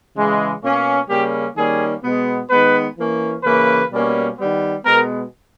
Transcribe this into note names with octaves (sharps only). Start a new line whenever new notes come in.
C#3 E3 G#3
B2 A#3 C#4
C#3 G3 A#3 C#4 G4
D#3 G3 A#3 C#4 G#4
B2 G#3 B3
D#3 G#3 B3 B4
E3 A#3 C#4
C#3 E3 A#3 C#4 B4
B2 G3 A#3 C#4
D#3 G3 B3
B2 G#3 B3 A#4